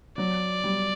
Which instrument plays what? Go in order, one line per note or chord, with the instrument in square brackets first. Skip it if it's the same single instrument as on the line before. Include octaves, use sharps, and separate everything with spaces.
[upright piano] F#3 [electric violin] D5
[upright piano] G3